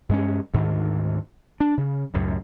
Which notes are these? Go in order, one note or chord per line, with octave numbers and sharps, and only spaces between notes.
G2 G#3 C#4
D2 G#2 D#3
D4
C#3
C#2 F#2 A2